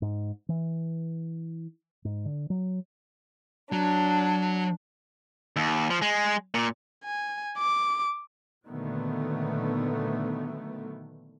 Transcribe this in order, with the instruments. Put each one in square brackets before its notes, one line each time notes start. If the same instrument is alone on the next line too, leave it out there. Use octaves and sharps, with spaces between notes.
[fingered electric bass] G#2
E3
G#2
D3
F#3
[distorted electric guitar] F#3 [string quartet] D4
[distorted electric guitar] D#2
F3
G#3
A#2
[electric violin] G#5
D6
[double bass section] A#2 D3 D#3 F#3 A3 B3